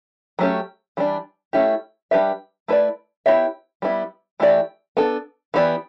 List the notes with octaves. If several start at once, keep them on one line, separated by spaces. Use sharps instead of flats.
F#3 A3 C#4 G4
E3 G3 D4
A3 C#4 E4 G4
G3 D4 G4 B4 E5
A3 E4 B4 D5
B3 E4 G4 C#5 E5
G3 B3 E4
E3 A3 E4 G4 D5
B3 D4 A4
E3 B3 E4 G4 D5